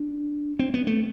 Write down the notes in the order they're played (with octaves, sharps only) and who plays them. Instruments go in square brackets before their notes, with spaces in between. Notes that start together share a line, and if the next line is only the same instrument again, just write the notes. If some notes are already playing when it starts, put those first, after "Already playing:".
Already playing: [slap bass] D4
C4
B3
A3